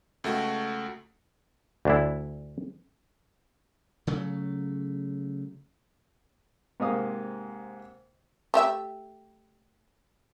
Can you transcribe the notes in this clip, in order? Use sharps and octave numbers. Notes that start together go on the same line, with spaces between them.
C#2 A3 F#4
D2 D4 E4
C#3 F#3 A3
G#2 C3 A#3 D#5 F5 D#6
A3 G4 E5